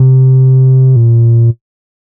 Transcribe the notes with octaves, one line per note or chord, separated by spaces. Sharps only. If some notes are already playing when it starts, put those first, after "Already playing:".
Already playing: C3
A#2